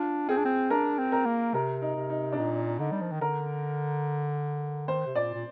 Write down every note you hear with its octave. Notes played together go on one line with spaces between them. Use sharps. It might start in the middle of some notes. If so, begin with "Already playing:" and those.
Already playing: D4 F4
C4 G#4
D4
C4
D4 A#4
C4
A#4
A#3
C3 A#4
D#4
C3
D#4
D4
A#2 D#4
D3 D#4
G3
F3
D#3
D3 A#4
D#3 C5
C3
A#2 D5
A#2